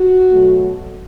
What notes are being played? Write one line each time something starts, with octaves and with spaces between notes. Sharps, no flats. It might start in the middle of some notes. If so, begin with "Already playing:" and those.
Already playing: F#4
B2 F#3 A3